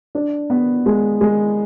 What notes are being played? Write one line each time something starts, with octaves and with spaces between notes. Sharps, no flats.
D4
B3
G#3
G#3